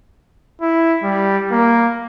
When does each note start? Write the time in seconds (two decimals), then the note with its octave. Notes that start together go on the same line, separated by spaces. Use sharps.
0.61 E4
1.03 G3
1.51 A#3